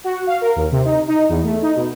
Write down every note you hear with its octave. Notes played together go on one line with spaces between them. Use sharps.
F#4
F5
A#4
D#2
C3
D#4
D#4
E2
A3
D#4
B2